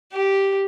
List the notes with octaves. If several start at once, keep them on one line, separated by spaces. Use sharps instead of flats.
G4